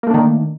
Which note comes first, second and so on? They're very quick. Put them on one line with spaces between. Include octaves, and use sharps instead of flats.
A#3 A3 D4 D#3